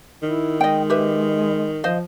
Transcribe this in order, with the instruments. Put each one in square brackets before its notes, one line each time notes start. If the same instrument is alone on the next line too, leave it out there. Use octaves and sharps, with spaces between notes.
[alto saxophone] D#3 [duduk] E4
[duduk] G#3 [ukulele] D#5 G5
[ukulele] G4 B4 E5
[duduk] F3 [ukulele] C5 D#5 F5